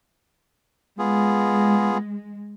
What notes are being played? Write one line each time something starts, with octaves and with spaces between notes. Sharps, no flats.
G#3 B3 F4 G#4